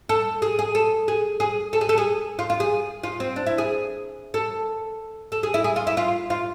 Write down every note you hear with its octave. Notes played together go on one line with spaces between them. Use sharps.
A4
G#4
G#4
A4
G#4
G#4
A4
G#4
A4
G#4
F4
F4
G#4
F4
C4
D4
E4
G#4
A4
A4
G#4
E4
G#4
F4
E4
F4
F4